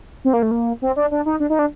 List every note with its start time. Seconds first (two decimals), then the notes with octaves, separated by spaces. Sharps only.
0.25 C4
0.33 A#3
0.43 A3
0.51 A#3
0.82 C4
0.96 D4
1.11 D4
1.26 D#4
1.40 D4
1.50 D#4
1.59 D4